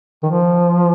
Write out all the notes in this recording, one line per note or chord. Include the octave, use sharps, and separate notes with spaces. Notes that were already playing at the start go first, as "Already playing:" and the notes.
D#3
F3